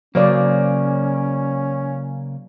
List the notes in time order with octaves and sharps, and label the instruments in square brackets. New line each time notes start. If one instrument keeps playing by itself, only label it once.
[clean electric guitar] C#3 A#3 [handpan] F#3 C5 D5 [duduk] C#4